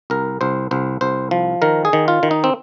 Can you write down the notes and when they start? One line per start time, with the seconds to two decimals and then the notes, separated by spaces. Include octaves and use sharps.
0.10 C2 A#4
0.41 C2 C5
0.71 C2 C5
1.01 C2 C5
1.31 F3
1.62 D#3 A#4
1.85 G#4
1.93 D#3
2.08 F4
2.23 D#3
2.31 D#4
2.44 C4